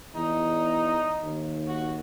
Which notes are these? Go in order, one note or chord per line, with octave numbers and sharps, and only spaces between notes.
E2 D#4
D#2
F#4